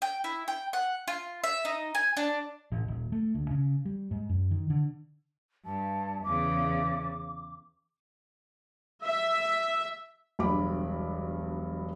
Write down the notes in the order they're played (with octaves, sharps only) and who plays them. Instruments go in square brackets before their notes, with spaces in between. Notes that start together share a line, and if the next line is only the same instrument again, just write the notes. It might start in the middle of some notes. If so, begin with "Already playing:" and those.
[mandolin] G5
E4
G5
F#5
F4
E5
D#4
G#5
D4
[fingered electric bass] A1
D#1
A3
D2
C#3
G3
G#2
F#2
D#3
D3
[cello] G2 [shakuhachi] A5
[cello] E2 C#3 [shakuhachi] D6
[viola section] E5
[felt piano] E1 B1 G2 B5 D6